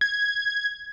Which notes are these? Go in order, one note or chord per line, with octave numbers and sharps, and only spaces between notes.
G#6